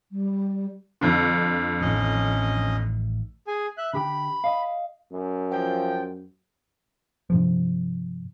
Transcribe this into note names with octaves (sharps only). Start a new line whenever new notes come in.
G3
F2 D3
A1 D#3 C#4 D#5
G#4 G#5
E5 F#6
D3 G4 G5 B5
D#5 F5
F#2
F3 G5
G2 C3 F3